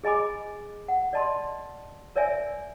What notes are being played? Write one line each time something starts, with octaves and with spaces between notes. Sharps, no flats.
G#4 D#5 G#5 B5 D6
F#5
D5 D#5 A5 B5 C6
A#4 C#5 D5 E5 G#5